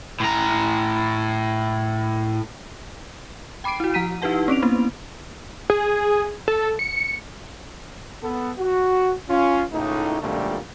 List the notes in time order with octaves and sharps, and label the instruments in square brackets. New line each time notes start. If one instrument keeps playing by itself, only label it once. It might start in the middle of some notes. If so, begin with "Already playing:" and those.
[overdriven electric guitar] A2 A#5
[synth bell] G5 B5 D6 C7 D7
E4 F#4
F3 A#5 B6 D#7
D#4 E4 G4 B4 F#5 A5
C4 C#4 D7 F7
A#3 B3 E4
[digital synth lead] G#4
A4
C#7
[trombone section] B3 A4
F#4
C#4 F4
C#2 A2 D#4
B1 F2 A#2 D3 G3 A3